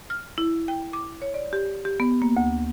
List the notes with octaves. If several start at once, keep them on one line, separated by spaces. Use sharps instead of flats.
F6
E4
G5
D6
C#5
D5
G4
G4
B3
A#3
D2